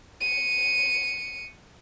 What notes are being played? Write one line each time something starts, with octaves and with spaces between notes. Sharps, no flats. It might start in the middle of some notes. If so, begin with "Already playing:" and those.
C#7 D#7